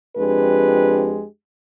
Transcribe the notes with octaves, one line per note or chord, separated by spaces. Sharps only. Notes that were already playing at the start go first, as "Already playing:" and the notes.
F2 G#3 D4 G4 B4